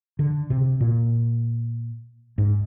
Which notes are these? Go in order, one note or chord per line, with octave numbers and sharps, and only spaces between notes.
D3
C3
A#2
G#2